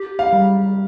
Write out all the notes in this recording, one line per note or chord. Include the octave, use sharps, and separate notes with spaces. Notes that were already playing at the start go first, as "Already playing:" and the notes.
Already playing: G4
F5
G3